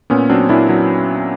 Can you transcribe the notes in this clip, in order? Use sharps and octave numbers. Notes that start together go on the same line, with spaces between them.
A#2 B3 C#4
F#3 C4 D4
A#2 D4 E4
F#3